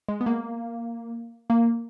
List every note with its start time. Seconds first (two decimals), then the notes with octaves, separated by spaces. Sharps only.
0.08 G#3
0.21 B3
0.26 A#3
1.50 A#3